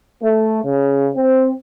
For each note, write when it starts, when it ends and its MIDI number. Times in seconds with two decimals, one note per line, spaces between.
0.23 0.60 57
0.64 1.08 49
1.16 1.51 60